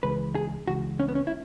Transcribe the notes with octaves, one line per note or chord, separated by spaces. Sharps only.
C#2 C#3 E3 G#3 B4
G#4
C#2 C#3 E3 G#3 F#4
C#4
B3
C#4
E4